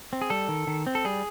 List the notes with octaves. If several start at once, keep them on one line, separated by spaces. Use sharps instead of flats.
C4
G#4
G3 A4
D#3
D#3
C4
A4
G3 G#4